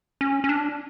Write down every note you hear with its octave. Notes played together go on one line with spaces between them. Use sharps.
C#4
C#4
D4